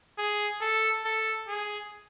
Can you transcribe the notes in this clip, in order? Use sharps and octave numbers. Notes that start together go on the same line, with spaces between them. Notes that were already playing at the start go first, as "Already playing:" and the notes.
G#4
A4
A4
G#4